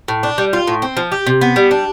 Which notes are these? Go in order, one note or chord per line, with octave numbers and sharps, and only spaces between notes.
A2
D4
G3
F4
A2
C4
F3
G4
C3
B3
G3
D4